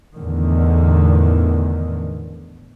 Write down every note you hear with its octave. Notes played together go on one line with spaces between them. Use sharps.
E2 A2 D3 D#3